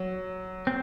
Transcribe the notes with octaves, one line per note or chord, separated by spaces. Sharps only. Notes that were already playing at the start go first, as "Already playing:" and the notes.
Already playing: F#3
C4